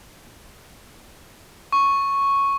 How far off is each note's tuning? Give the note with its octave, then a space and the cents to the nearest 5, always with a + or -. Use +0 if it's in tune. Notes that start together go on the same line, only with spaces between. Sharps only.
C#6 -5